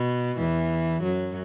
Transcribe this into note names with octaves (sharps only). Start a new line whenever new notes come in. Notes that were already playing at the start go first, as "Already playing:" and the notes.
Already playing: B2
E2 E3
F#2 F#3